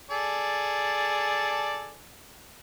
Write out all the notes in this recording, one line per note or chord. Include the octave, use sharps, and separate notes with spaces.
G#4 A4 D5